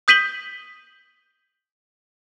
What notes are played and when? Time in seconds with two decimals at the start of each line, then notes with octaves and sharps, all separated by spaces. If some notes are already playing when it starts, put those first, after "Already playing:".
0.08 D#6 G6 B6 D#7 F#7 G7